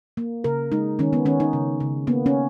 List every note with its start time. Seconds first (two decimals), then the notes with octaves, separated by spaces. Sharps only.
0.17 A#3
0.44 C#3 A#4
0.72 G#3 D#4
0.99 D#3 C#4
1.13 B3
1.25 D#3 C#4
1.40 D#4
1.53 C#3
1.80 C#3
2.07 A#3 B3
2.26 C#4